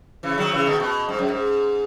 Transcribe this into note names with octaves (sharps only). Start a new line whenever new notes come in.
C#3 E3
D#3 F#3
C#3 E3
B2 D#3
B2
G#2
F#2
G#2